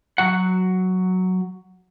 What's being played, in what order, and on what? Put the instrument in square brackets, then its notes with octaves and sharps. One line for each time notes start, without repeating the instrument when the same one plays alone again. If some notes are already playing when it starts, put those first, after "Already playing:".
[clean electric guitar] F#3 F#4 F#5